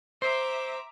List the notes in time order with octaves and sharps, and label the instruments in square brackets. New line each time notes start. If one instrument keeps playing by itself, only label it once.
[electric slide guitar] C5 [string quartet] E5 A#5 D6